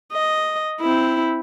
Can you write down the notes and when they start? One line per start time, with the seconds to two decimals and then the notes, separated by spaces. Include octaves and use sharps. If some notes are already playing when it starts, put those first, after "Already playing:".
0.13 D#5
0.80 C4 E4